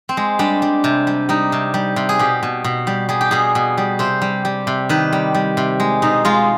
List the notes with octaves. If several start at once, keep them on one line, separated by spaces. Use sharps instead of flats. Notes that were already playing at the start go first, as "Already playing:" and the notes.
C4
G#3
G3 D4
G3
C3
G3
G3 D#4
C3
G3
C3
G#4
B2 G4
B2
B2
G3
G3 G#4
G4
B2 G#4
B2
G3
C3 C5
G3
G3
C3
D#3 B4
G3
G3
C3
G#3
B2 D#4
G#3 F4